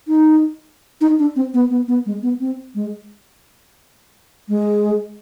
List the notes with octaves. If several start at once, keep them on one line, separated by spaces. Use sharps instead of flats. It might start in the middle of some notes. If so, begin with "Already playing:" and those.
D#4
D#4
D4
C4
B3
B3
B3
G#3
B3
C4
G#3
G#3